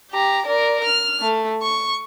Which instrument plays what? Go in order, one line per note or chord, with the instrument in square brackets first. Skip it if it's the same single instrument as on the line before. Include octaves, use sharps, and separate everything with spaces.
[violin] G4 A#5
A#4 D5
F6
A3
C#6